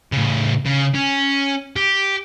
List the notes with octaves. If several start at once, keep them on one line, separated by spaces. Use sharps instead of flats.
A2 C#3
C#3
C#4
G4